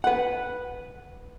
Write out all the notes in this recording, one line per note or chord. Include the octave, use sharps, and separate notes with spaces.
B4 F#5